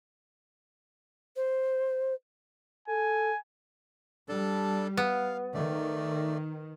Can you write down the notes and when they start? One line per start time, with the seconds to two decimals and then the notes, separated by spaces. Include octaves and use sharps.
1.36 C5
2.88 A4 G#5
4.29 G3 D4 A4
4.97 B3 F5
5.54 D#3 A3 D5